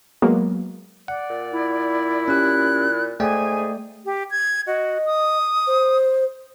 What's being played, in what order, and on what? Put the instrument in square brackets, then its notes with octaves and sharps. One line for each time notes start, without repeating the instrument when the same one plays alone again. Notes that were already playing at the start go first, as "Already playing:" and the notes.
[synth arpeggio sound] F#3 G#3 A#3 B3
[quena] D5 [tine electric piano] F#5
[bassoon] A#2
[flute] E4
[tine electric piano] C#4 G4 [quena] F#6
[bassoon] G#2 [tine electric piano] A3 D5 G5 [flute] G#4 [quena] G#5
[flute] G4
G#6
[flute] F#4 [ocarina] D#5
[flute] D#6
[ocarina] C5